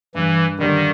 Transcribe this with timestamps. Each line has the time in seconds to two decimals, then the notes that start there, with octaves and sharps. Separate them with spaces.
0.15 G2 E3
0.58 D3 D#3 G3